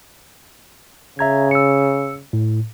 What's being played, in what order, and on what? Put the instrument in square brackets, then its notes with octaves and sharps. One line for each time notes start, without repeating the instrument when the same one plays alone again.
[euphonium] C#3 [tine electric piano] E5 A#5 G#6
[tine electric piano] E6 C#7
A2